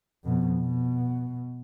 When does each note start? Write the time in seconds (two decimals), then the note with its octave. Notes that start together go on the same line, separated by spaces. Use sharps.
0.24 F2 B2
0.60 B2